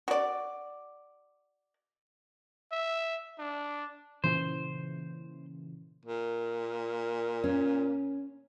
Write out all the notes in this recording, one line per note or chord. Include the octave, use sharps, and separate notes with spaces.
F#4 D5
E5
D4
A#2 C#3 E3 C5
A#2
C#4